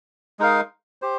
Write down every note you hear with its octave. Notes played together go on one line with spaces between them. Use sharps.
G#3 D#4 A#4 F5
G4 C5